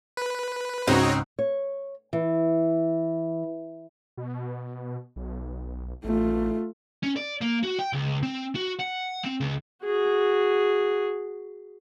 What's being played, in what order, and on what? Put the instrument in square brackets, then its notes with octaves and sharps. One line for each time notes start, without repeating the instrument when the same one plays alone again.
[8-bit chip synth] B4
[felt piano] C#2 G#2 [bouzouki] C4 D#4 [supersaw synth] F#4 C#5 D#5
[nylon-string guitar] C#5
E3
[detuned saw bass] B2
B1
[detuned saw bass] A1 [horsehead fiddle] A3 F4
[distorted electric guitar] C#4
D5
A#3
F#4
G5
C#2
C4
F#4
F#5
C4
C#2
[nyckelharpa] F#4 G#4